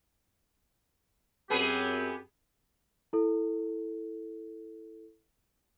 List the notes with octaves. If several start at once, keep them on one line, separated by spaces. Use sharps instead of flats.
F#2 B3 C4 G4 G#4 B4
E4 A4